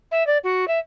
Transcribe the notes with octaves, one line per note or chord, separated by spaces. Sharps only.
E5
D5
F#4
E5